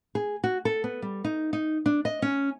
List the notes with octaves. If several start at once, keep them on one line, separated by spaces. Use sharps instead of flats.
G#4
F#4
A4
B3
G3
D#4
D#4
D4
D#5
C#4